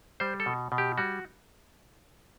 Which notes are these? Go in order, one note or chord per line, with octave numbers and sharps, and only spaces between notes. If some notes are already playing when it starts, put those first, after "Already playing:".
G3 C5
A4
B2
B2
G4
G3 F#4